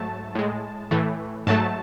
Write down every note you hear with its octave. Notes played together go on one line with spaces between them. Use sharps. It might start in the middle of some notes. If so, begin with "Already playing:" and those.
Already playing: G#2 F#3 A3 A5
A2 G#3
A2 E3 A3
G#2 F#3 A3 A5